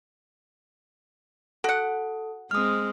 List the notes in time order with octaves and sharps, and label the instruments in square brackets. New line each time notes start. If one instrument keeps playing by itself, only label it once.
[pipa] F#4 F#5 [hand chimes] A4
[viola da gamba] G#3 C4 [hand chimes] D#6 F6